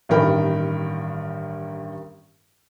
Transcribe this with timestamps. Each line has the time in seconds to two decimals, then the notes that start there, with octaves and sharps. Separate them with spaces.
0.09 A1 G2 D#3 A#4 G5 B5